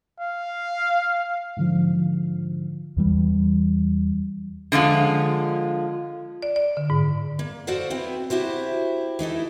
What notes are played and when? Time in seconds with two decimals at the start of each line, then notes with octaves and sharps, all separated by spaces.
0.20 F5
1.57 G#2 D3 F3
2.97 E2 E3 G3
4.72 D3 F3 G#3 F4
6.43 D5
6.56 D5
6.77 D3
6.90 G#2
7.39 A#3
7.67 F#4 A4 C5 D5 F5 F#5
7.90 B3 C4 E4
8.30 E4 F#4 G4 C5
9.19 E3 D#4 E4 A4